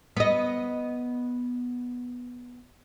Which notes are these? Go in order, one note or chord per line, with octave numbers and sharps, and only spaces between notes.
B3 D#5